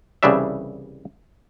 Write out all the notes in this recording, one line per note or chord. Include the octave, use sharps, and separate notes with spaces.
C2 C#3 E3 G3 D4 E5